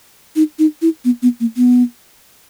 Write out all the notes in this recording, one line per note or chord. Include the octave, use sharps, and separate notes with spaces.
D#4
D#4
E4
B3
B3
A#3
B3